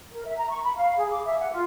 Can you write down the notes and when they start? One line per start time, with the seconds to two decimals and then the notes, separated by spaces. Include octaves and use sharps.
0.12 A#4
0.24 E5
0.38 A#5
0.50 C#6
0.64 B5
0.76 F5
0.97 G#4
1.10 D6
1.25 E5
1.40 F#5
1.52 F4